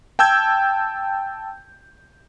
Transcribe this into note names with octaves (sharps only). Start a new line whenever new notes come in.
G5 A5 E6 G6 G#6